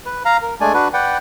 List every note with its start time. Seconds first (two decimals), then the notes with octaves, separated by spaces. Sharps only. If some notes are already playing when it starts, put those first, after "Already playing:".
0.06 B4
0.25 F5 A#5
0.42 A#4
0.60 G#3 A3 D4 D5 G#5
0.74 D4 F#4 B4
0.94 B4 D5 F#5 G5